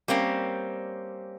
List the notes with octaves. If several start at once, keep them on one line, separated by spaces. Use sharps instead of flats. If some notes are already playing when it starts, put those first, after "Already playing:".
G3 A#3 C4 C#4